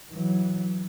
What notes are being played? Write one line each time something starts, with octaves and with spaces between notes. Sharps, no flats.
E3 F#3